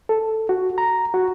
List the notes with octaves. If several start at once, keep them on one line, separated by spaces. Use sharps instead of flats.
A4
F#4
A#5
F#4